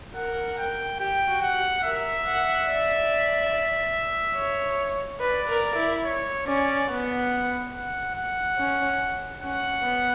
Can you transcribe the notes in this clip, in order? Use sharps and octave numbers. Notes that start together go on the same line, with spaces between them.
A#4 F#5
G5
G4 G5
F#4
F#5
G4
A#4 E5
F#5
D5
C#5
B4 D5
A#4
E4
C#5
C#4 D5
B3 F#5
F#5
F#5
C#4
C#4 F#5
B3